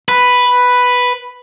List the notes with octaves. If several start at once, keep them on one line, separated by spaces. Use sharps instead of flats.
B4